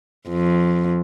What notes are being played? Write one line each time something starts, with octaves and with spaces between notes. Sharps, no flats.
F2